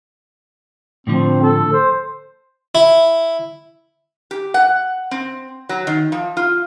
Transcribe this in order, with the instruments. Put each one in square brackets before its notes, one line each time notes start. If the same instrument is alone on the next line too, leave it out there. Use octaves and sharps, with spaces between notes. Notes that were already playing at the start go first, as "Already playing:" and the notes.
[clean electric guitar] A2 D3 F3 [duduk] C4
[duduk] A4
C5
[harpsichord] E4
[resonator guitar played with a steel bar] G4
F#5
C4
F#3
D#3
F3
F4